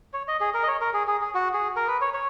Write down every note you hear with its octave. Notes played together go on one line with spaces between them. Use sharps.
C#5
D#5
G#4
A#4
D#5
C#5
A#4
G#4
G#4
G#4
F#4
G#4
A#4
B4
C#5
C#5